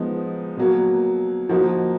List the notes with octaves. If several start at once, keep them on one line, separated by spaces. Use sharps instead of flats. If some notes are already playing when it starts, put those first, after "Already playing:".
Already playing: F3 G#3 B3 D#4
B2 F#3 A#3
F3 A#3 D#4 F#4